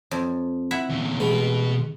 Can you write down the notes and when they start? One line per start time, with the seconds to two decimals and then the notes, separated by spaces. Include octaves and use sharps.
0.11 F2
0.71 E4 E5 F#5
0.90 E2 A#2
1.20 A1 B2 G#3 B4